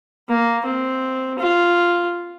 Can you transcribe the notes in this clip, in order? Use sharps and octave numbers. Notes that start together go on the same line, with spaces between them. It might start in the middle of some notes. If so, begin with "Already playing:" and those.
A#3
C4
F4